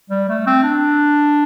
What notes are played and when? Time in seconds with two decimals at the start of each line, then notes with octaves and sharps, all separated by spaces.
0.10 G3
0.29 A3
0.47 C4
0.64 D4